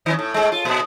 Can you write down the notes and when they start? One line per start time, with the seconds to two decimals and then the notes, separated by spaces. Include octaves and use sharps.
0.06 D#3 C#4
0.19 A2
0.34 A2 G#3
0.52 F4
0.65 A#2